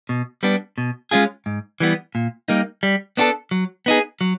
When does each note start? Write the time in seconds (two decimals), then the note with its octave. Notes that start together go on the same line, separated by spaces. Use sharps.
0.09 B2
0.43 G3 B3 D4
0.78 B2
1.11 G#3 C#4 F4 G#4
1.46 G#2
1.80 E3 G3 B3
2.15 A#2
2.48 G3 A#3 D#4
2.83 G3
3.17 B3 D4 F#4 A4
3.51 F#3
3.86 B3 D#4 G#4
4.21 F#3